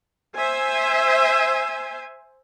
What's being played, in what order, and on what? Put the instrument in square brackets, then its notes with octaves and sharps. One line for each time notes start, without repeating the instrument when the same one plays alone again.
[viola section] C5 E5 G#5